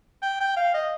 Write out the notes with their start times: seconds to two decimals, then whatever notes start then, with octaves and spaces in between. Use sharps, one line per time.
0.22 G5
0.40 G5
0.57 F5
0.74 D#5